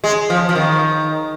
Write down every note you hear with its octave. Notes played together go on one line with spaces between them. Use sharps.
G#3
F3
F3
D#3